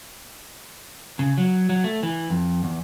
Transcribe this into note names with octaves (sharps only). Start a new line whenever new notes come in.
C#3
F#3
F#3
A3
E3
F2
E2